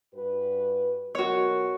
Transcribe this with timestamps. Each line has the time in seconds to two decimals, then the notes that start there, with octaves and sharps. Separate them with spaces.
0.14 G2 F#4 B4
1.15 B2 F#3 F#4 A#4 C#5